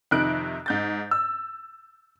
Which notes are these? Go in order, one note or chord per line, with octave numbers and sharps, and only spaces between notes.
F2 C3 D#3 D#4 F#6 D7
G#2 G6 A6
E6